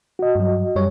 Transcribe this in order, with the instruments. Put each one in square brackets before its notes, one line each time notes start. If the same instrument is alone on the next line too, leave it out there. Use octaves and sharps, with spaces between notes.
[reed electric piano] F#4 D#5
[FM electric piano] G2 F#3
F#2 G3 C#5